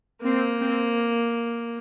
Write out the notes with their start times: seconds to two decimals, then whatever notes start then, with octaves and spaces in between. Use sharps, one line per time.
0.23 A#3 C4
0.61 C4